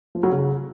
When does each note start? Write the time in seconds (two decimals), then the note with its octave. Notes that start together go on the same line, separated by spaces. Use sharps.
0.15 F3
0.23 F#3
0.32 C#3